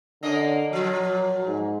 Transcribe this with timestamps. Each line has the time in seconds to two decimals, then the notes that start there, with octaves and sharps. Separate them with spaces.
0.23 D3 A#3 C#4 D#5
0.73 A#2 F3 F#3
1.47 G#2